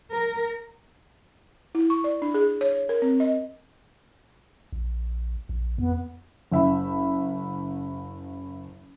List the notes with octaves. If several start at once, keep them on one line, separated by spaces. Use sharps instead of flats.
A#4
E4
C#6
D5
D4
G#4
C#5
A#4
C4
D#5
A#1
A#1
F2 B3
F#1 E5 B5